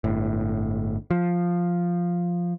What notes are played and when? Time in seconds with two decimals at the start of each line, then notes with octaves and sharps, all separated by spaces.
0.04 G1 A2
1.11 F3